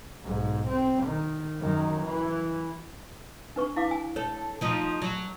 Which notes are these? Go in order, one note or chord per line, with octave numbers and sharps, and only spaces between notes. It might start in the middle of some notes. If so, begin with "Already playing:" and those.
B1 G#2
C4
D#3
F#2 D#3
E3
D4 B4 C#6
E4 F5 D6
G#5
A4 C#5
F3 D#4
F#3